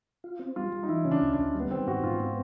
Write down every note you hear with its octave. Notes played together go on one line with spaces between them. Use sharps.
F4
C4
G3 F4
G3
D#4
E3 E4
C#3 C#4
D4
D2
D4
D2
G3
B3
D#3 C4
G#2 F#4
G#2 F4
B3 F4